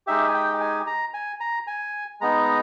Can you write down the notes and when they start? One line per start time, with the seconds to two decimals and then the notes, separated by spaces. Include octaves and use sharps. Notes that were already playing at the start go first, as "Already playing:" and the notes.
0.07 G#3 D#4 G4 E5
0.28 G#5
0.34 G5
0.60 G#5
0.87 A#5
1.14 G#5
1.40 A#5
1.67 G#5
2.21 G#3 B3 D#4 A#5